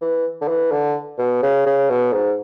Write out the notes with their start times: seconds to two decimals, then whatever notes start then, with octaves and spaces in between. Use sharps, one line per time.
0.01 E3
0.41 D3
0.48 E3
0.72 D3
1.18 B2
1.42 C#3
1.66 C#3
1.89 B2
2.13 G#2